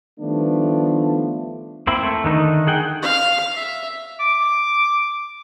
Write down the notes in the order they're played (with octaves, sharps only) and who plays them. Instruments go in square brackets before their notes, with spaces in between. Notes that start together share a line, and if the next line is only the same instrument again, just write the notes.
[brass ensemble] D#3 F3 G3 A3 B3 D4
[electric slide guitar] A#3 C4 E4
A3
D3 D#3 D#4
G#4 F#5 G5
[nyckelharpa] F5
E5
[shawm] D6